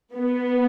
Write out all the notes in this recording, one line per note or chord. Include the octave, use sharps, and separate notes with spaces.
B3